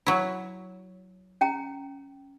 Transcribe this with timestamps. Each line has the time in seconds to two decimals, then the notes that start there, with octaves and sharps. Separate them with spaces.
0.06 F#3 E4
1.41 C#4 G5 A#5